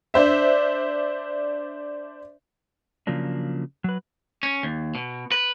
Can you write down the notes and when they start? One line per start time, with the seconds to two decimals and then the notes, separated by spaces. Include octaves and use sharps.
0.14 D4 C5 E5
3.07 C#3 F3 F#3 A#3 D4
3.84 F#3 B4
4.43 C#4
4.63 D#2
4.95 B2
5.32 B4